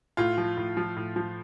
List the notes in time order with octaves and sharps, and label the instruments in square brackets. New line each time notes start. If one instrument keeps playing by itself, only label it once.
[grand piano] A2 F4
F3
A2
F3
A2
F3